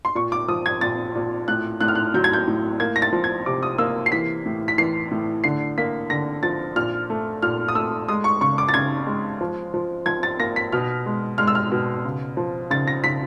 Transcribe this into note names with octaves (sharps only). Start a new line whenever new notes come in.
C6
A#2 C#6
D6
F3 D#6
G#6
A#2 A6
A#2
A2 F#6
A2 F#6
F6
F#6
F#3 G6
G#6
G6
A2
A#3 G#6
A#6
A6
F3
G#6
C3 D6
D#6
A#3 E6
C7
E3 B6
A2
B6
E3 C7
A2
D3 C7
A#3 B6
D3 A#6
F3 A6
A#2 F6
A3
A#2 F6
D#6
A3 E6
G#3 D#6
C#6
C#3 C#6
D6
A6
C#3 G#6
G#3
F3
F3
F3 G#6
A6
A#3 A#6
B6
B2 F6
G#3
G#3 F6
E6
F6
B2
C#3
F3
C#3 A6
A#6
C#3 B6